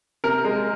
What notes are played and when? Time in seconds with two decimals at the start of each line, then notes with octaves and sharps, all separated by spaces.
0.24 C3 A#4
0.45 G#3